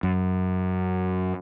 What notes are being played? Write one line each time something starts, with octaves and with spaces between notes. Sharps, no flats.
F#2